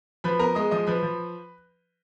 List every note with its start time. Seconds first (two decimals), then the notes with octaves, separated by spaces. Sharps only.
0.24 F3 B4 B5
0.39 B3 A#4 A#5
0.55 G#3 D#5 D#6
0.71 F3 D#5 D#6
0.87 F3 B4 B5
1.03 F3